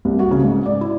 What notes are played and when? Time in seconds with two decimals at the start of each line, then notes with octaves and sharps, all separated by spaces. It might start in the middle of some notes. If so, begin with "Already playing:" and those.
0.05 C2
0.19 F#4
0.31 C#3
0.43 G#2
0.66 D5
0.81 E4